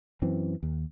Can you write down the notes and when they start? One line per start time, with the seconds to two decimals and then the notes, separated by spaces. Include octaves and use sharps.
0.22 F#2 E3 C4
0.63 D#2